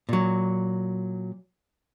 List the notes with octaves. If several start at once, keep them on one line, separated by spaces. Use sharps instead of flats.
A#2 F#3